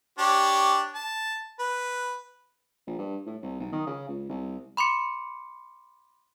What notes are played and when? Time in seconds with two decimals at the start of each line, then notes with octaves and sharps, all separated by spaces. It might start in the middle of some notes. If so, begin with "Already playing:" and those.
0.19 D4 G4 C#5
0.94 A5
1.59 B4
2.87 A#1
2.99 G2
3.26 A2
3.43 C2
3.60 B1
3.73 D#3
3.87 C#3
4.09 C#2
4.29 C2
4.77 B5 C6 D6 C#7